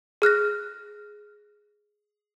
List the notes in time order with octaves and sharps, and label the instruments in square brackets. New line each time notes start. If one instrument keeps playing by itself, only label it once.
[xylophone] G#4 F6 F#6 A#6